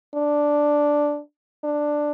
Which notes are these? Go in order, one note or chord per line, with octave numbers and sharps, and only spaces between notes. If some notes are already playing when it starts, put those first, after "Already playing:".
D4
D4